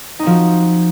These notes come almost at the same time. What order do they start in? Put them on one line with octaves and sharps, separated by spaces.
D#4 C4 F3 F#4